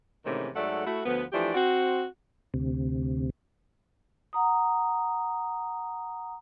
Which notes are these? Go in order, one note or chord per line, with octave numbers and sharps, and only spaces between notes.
G#2 C3 D#3 E3 A3 C#4
G#2 F#3 A3 A4 D5 F#5
A3 E4 F#4
D2 F3 B3
E3 F3 A3 D4 G4 D5
C4 F#4
D2 C3
F#5 A#5 D#6